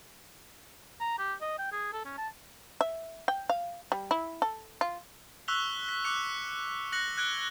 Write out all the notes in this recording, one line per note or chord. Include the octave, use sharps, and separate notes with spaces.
A#5
G4
D#5
G5
G#4
A4
C#4
A5
E5
G5
F5
G3
E4
A4
F4
C#6 E6 F#6 B6 F7 G7
B6
D6 F#6 C#7 F7
F#6 A#6 C#7 F#7
F#6 G#6 D7 G7